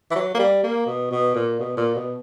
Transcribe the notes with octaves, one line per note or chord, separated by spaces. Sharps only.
E3
F#3
A#3
G3
A#3
B2
B2
A#2
B2
A#2
B2